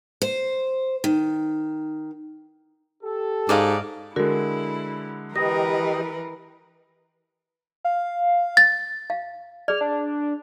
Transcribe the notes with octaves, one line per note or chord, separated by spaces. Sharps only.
C5
D#3
G4 A4
G#2 D5 D#5 F5
D3 G#3 E4 F#4 A#4
E3 G4 A#4 B4 D#5 A#6
F5
A6
F5
G#4 D5 F6
D4